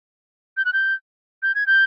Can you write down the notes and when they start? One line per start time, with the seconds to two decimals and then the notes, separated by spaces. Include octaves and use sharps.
0.57 G6
0.65 F#6
0.73 G6
1.43 G6
1.55 G#6
1.67 G6